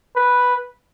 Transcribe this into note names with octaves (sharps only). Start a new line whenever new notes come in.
B4